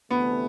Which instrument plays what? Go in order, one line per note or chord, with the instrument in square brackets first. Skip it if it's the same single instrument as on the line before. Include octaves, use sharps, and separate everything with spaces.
[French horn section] D2 C3 E3 A3 [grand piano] B3